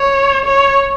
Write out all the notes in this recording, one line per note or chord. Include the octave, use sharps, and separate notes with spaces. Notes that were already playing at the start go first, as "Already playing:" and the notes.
Already playing: C#5
C#5